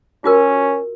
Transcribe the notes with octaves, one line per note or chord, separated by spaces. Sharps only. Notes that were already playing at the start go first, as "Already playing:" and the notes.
C#4 F4 F#4 A#4